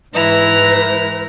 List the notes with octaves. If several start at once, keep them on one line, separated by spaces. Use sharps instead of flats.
G#2 E3 E4 B4 A#5